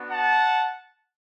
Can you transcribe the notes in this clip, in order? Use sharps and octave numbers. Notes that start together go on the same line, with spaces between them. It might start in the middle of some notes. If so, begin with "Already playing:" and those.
Already playing: B3 D4 F#4
F#5 A5